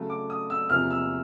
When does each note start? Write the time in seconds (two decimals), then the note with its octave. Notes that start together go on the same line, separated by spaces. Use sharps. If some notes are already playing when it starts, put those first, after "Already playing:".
Already playing: C#3 F#3 A3
0.10 D6
0.30 D#6
0.50 E6
0.69 E2 C3 F3 A#3 F6
0.90 E6